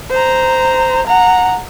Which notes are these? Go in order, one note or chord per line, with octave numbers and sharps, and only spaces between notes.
C5 A#5
F#5 A#5